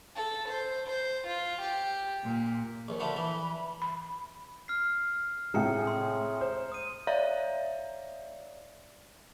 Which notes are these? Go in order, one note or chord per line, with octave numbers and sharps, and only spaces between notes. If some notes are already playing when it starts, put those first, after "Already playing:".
A4
C5
C5
F4
G4
A#2
A#1 D#2
D3 F3 A3 B5
E3
B5
F6 C7
A2 C3 G#3 A#5 C#7
C6
C5
D#6 D#7
C#5 D5 E5 F5 A#5